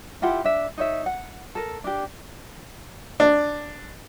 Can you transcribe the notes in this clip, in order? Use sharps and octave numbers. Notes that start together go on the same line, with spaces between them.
E4 F4 G4 F#5
D4 E5
D#4 C#5 E5
F#5
A4 A#4
D4 G4
D4